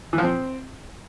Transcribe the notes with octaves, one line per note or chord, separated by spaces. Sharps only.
E3
F3
C4